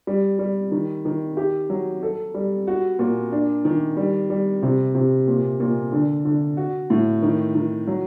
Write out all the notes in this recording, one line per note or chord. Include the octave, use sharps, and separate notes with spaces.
G3
G3
D#3
D#3
G4
F#3
A4
G3
F#4
A#2
D4
D#3
G3
G3
C3
C3
A#2
A#2
D3
D3
F#4
A2
D#3
D#3
F#3